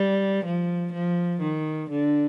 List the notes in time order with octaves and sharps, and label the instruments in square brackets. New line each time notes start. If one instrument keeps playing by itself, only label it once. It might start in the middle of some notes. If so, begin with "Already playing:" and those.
Already playing: [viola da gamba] G3
F3
F3
D#3
D3